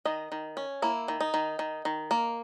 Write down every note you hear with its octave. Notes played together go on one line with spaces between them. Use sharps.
D#3 D#5
D#3
C#4
A#3 E4
D#3
D#4
D#3
D#3
D#3
A#3